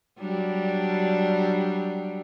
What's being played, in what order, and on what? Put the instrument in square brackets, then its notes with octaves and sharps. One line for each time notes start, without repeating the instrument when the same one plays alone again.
[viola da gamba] F#3 G3 D4